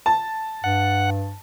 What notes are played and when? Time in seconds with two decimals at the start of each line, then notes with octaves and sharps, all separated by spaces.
0.06 A5
0.64 G2 F#5